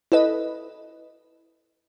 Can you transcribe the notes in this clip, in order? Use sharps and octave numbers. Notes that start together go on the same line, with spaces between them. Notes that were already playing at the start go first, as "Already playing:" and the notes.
E4 A4 B4 D#5